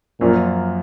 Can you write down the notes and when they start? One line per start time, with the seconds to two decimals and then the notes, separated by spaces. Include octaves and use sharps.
0.21 F#2 A#2 F3 A#3 F4